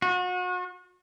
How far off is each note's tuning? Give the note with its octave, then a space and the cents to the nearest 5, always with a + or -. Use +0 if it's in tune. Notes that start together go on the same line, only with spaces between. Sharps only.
F#4 -35